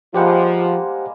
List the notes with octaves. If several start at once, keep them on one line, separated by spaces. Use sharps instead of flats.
F3 G3 G#3 A#3 G4 C5 F#5